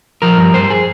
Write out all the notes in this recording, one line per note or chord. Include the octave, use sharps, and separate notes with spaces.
F3 A#4
G2
G2 C5
G#4